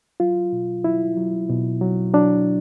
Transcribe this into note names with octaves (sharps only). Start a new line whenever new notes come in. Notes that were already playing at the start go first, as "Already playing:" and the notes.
F#3 F4
B2
F#3 E4
F#3
B2
F#3
F#3 D4